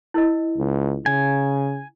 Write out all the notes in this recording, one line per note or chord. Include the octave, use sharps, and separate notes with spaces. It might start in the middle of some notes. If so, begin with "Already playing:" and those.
E4 A#4 D#5
C#2
C#3 G#5